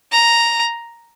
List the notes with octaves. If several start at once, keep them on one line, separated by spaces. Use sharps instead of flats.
A#5